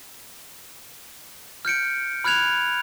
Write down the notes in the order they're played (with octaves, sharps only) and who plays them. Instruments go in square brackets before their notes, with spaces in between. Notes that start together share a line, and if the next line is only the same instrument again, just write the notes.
[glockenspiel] F6 G6 C#7 D7
B5 F6 F#6 G#6 F7